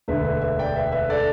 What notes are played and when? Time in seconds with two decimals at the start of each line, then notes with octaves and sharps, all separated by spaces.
0.08 E1 D2 D3 B4 E5
0.25 B4 E5
0.42 B4 E5
0.59 D5 G5
0.76 B4 E5
0.92 B4 E5
1.10 A4 D5